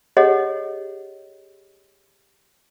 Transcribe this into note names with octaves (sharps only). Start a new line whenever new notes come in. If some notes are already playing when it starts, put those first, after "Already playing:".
G4 G#4 C#5 D#5 F#5